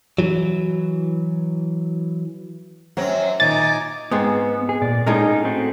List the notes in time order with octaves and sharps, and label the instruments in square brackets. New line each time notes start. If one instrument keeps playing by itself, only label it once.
[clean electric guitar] E3 F#3
[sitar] F#2 F#3 A#4 [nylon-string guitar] C4 C#4 F#5
[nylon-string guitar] A#2 [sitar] D#3 [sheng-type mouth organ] D#4 G#5 D6 [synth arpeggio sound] A6
[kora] G#2 G#3 C4 [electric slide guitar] B3
[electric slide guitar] G#4
A#2 D5
[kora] A2 G#3 A#4 [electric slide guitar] C#4 D#4
[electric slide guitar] A3 C4 F#4